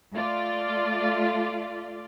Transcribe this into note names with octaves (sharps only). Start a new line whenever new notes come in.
A3 F4 D5